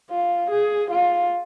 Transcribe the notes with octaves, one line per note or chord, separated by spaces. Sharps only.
F4
G#4
F4